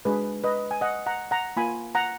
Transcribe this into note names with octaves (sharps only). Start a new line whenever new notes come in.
G#3 D4 F#4 G#4 B4
B4 D#5
G#5
D#5 F#5
F#5 A#5
F#5 A#5
A#3 F4 G#5 B5
F#5 A#5